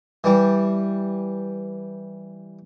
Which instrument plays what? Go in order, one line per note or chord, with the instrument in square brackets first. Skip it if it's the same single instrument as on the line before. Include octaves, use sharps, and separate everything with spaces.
[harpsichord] E3 G3